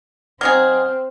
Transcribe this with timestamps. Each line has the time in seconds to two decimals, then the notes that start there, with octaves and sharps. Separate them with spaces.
0.41 F#3 C4 D#4 G#4 F6